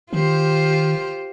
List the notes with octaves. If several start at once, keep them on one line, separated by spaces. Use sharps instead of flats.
D#3 F4 G4 C5